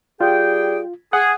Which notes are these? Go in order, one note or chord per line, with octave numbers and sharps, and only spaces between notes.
G3 F4 G#4 G5
G#4 F#5